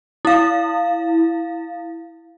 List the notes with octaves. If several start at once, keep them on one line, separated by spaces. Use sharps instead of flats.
E4 F5